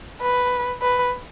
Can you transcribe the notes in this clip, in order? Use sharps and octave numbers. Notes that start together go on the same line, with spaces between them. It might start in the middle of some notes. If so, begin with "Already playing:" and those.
B4
B4